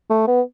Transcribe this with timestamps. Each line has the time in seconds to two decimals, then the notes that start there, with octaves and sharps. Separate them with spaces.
0.10 A3
0.28 B3